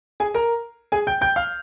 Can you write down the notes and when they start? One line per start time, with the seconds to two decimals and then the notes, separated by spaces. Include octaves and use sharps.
0.20 G#4 G#5
0.34 A#4 A#5
0.92 G#4 G#5
1.07 G5 G6
1.21 G5 G6
1.36 F5 F6